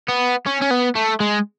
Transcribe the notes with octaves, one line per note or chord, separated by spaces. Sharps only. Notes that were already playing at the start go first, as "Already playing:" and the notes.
B3
C#4
C#4
B3
A3
G#3